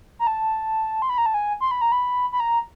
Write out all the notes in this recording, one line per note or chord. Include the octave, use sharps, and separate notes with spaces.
A#5
A5
C6
B5
A#5
A5
G#5
C6
B5
A#5
B5
B5
A#5